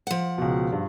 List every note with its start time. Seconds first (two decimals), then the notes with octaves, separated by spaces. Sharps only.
0.07 F3 F#5
0.38 C#2 B2
0.72 G2